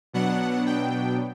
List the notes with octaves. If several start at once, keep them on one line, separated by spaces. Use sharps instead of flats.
B2 F#3 B3 D4 F#5
G5